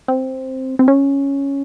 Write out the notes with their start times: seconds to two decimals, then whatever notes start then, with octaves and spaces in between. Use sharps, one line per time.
0.08 C4
0.79 C4
0.88 C#4